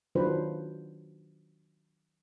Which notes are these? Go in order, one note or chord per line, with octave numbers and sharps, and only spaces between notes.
D#3 F#3 D4 F4 B4 C5